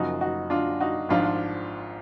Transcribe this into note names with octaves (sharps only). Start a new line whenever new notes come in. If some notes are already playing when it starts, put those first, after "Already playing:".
Already playing: F#1 F#2 F3 D#4 F#4
D#4 F#4
D4 F4
D#4 F#4
G#1 G#2 F3 D4 F4